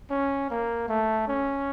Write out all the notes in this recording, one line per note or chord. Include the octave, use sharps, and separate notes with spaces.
C#4
A#3
A3
C#4